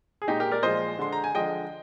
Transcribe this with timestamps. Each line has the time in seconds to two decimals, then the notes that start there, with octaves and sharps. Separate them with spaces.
0.22 G#4
0.27 A#2 G#3 D#4 G4
0.40 G4 A#4
0.51 A#4 D5
0.63 A#2 F3 G#3 C5 D#5
0.99 D3 G#3 C6
1.13 A#5
1.24 G#5
1.35 D3 F3 G#3 D#5 G5